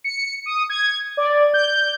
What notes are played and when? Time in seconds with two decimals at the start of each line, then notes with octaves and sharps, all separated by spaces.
0.04 C#7
0.46 D#6
0.70 G#6
1.17 D5
1.54 G6